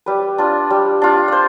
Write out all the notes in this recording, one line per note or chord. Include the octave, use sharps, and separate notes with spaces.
G3 B4
D4 F4
G3
D4 F4
C5 D5